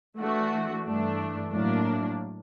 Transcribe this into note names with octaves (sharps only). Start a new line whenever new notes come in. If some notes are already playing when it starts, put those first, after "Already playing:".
E3 A3 D4 F#4
G2 E3 A3 D4
A2 F#3 A#3 D4